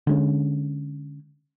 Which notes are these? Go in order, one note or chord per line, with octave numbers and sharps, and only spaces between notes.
D3 G#3 C#4